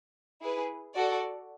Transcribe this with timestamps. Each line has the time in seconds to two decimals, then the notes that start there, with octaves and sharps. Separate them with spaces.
0.40 E4 G#4 B4
0.94 F#4 A4 D5